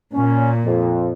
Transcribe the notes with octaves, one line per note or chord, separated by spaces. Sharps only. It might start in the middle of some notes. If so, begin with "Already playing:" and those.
A#2 C#4
F2